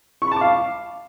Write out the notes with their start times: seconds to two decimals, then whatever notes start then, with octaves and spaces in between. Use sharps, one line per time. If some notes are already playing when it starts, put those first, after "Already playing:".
0.22 C#6
0.27 B5
0.32 A5
0.36 D6
0.41 F5